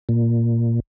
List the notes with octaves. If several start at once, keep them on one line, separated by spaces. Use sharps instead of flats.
A#2